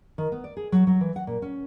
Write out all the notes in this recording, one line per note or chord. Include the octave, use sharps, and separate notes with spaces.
D#3
B3
D5
G#4
F#3
F#3
E3
F#5
A#2
C#4